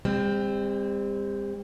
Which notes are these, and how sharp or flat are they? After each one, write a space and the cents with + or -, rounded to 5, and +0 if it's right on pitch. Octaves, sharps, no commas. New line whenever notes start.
G3 +45 C4 +0